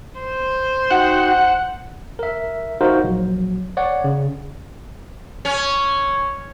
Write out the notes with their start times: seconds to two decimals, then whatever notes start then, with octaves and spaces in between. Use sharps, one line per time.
0.19 C5
0.91 D#4 F#4 F#5 G5
2.19 A#4 E5
2.81 D#4 F4 F#4 A#4 C5
3.04 A#1 F#3
3.77 C#5 D5 F#5
4.04 C#3
5.45 C#4